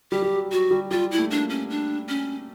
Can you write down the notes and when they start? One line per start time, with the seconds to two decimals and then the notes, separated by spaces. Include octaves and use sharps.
0.11 G3 G4
0.22 G3
0.32 F#3
0.52 F#3 F#4
0.71 G3
0.91 G3 F4
1.11 E4
1.18 A3
1.30 A#3 D4
1.50 C#4
1.70 D4
2.09 C#4